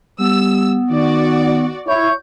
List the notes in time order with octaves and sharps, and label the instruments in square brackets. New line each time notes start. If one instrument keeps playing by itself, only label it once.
[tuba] G3 [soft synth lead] B3 [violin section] E6
[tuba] D#3 [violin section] F#4 D5
[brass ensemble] E4 C#5 [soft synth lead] G6